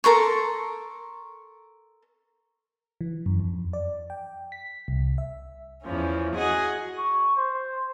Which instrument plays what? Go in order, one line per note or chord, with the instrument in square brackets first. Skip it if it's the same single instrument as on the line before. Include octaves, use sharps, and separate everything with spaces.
[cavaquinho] A4 A#4 C6 C#6
[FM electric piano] E3
F#2
F2
D5
G5
B6
C2
E5
[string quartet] E2 E3 F3 C#4
F#4 G#4 D#5 F#5
[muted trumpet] C#6
C5